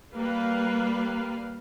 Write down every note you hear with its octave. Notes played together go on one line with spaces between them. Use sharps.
G3 A#3 B4 F5